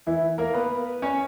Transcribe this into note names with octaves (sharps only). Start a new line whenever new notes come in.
E3 E4
A#3 A#4
B3 B4
C#4 C#5